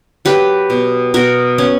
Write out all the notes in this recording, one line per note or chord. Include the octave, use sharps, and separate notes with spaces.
F#3 G4 B4
B2
B2 F#4 A#4
B3 C#4